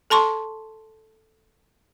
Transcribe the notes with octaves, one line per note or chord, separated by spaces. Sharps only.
A4 A5 C6 C#6